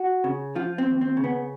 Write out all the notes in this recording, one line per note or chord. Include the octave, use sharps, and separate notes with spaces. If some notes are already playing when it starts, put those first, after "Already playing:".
Already playing: F#4
C#3
F3 F4
C4
D#2
C4
C#3
B3